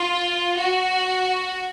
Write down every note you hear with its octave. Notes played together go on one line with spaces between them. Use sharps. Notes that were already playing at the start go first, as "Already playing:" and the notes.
Already playing: F4
F#4